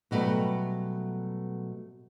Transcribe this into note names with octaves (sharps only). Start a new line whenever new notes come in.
B2 F#3 G3 A3 B3